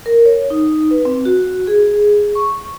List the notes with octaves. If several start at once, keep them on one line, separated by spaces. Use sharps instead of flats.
A#4
C#5
D#4
B4
C4
F#4
G#4
C#6